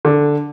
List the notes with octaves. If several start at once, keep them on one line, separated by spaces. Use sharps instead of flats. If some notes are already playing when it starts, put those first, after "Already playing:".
D3